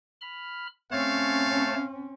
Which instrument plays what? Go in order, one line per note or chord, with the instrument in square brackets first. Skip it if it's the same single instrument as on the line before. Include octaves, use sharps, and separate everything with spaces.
[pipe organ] B5 F6
[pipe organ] A3 C#5 A5 [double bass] C4 C#4 [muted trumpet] F5